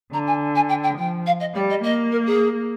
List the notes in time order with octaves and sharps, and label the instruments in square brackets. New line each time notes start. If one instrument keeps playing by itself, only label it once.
[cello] D3 [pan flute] A#5
[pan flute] G#5
G#5
G5
G5
[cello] F3 [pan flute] G5
[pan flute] F5
D#5
[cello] G3 [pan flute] D5
[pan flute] D#5
[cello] A#3 [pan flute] D#5
[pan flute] A#4
G#4